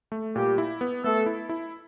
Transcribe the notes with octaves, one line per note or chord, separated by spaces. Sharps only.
A3
A#2 G3 G4
E4
B3
A3 B3 A4
E4
E4